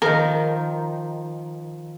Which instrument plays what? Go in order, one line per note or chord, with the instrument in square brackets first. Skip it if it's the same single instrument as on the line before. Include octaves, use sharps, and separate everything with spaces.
[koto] D#3 F3 [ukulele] A#4